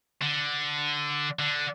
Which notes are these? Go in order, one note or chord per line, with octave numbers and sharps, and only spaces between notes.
D3
D3